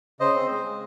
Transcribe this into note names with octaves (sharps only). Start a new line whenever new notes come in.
C#3 C5 D#5
C4
G#3
G#3